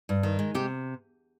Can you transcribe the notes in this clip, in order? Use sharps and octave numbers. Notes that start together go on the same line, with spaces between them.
G2
D#3
G#3
C3 G4